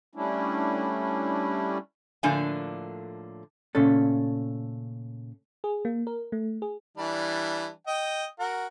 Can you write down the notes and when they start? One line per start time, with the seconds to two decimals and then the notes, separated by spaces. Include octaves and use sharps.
0.15 G3 A3 C#4 D4 E4
2.23 A2 D3 F3 A#3 D4 G#5
3.75 A#2 C#3 A3 C#4 A4
5.64 G#4
5.85 A#3
6.07 A#4
6.32 A3
6.62 G#4
6.97 E3 G3 D4
7.87 D#5 G5
8.39 F#4 A#4